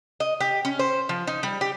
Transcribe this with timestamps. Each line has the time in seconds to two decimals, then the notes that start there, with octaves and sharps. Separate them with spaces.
0.20 D#5
0.40 G4
0.65 C#4
0.79 C5
1.09 F3
1.27 D#4
1.43 G3
1.61 G4